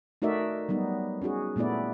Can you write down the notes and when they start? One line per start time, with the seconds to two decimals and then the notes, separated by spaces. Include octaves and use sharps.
0.22 A3 D#4 F#4 A#4 D5 E5
0.69 F#3 G3 B3 D#4
1.22 C#4 D#4 F#4 G#4
1.56 A#2 A3 B3 E4 D5